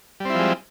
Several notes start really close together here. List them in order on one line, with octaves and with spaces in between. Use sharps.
G3 C4 E4 F3 G#3